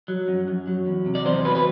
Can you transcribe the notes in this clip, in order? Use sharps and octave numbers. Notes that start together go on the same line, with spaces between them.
F#3
F#2
F#2
F#3
E2
C3
D5
E2 C5
F#3 B4
B4